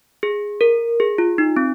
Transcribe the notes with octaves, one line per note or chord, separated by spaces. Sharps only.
G#4
A#4
G#4
F4
D#4
C4